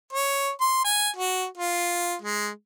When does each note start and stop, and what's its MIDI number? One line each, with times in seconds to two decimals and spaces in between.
0.13 0.50 73
0.61 0.83 84
0.85 1.09 80
1.16 1.45 66
1.57 2.14 65
2.22 2.49 56